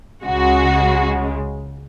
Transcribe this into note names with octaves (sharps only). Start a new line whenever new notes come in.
C#2 C#3 G#3 F#4